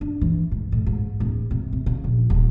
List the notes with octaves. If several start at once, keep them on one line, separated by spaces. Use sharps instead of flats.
D4
E3
G#2
A2
G#2
D1
C3
C3
C#3
A#1
D#1